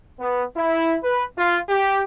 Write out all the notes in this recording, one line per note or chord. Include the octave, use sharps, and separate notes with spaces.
B3
E4
B4
F4
G4